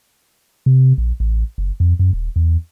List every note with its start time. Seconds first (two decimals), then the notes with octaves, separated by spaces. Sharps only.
0.66 C3
0.98 A#1
1.20 A1
1.58 F#1
1.80 F2
1.99 F#2
2.13 D#1
2.36 E2